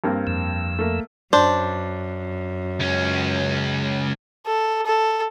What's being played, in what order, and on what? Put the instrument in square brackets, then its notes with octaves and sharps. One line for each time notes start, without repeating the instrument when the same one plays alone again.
[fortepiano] G2 A#3 C4
[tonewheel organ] F2 E6
[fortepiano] A3 A#3
[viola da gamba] F#2 [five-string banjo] D4 C5
[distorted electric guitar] C#2 C#4
[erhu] A4
A4